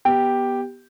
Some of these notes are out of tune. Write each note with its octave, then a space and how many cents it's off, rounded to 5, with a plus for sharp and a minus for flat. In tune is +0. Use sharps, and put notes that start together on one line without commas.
B3 -10 G4 +0